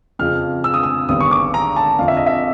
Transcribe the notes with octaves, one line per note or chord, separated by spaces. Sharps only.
F2 C#3 F3 F6
E6
D#6
E6
G#1 G2 D3 G3 B3 D#6
C#6
D6
A#5
A5
F2 D3 F3 F5
E5
D#5
E5